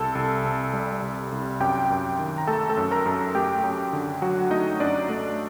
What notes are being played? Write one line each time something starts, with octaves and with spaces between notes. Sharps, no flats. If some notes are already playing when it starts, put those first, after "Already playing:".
Already playing: C2 A4 A5
C2
C3
G3
C2
C2
F#2 G4 G5
F#2
D#3
A#5
A3 A4 A5
A4 A5
F#2
A#4 A#5
F#2
A3 G4 G5
F#2
D3
F#3 F#4 F#5
A3 D#4 D#5
F#2 D4 D5
A3